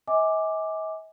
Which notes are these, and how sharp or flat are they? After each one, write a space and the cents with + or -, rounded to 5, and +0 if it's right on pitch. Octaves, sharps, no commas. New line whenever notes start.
D#5 +45 G#5 -10 D6 +0